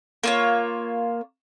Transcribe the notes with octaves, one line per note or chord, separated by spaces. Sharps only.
A#3 F4 C#5